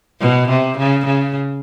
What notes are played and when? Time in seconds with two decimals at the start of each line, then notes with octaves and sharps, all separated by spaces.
0.21 B2
0.50 C3
0.78 C#3
1.06 C#3